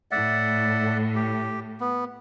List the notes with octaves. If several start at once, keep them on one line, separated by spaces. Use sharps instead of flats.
A2 D5 E5 F#5
G4
B3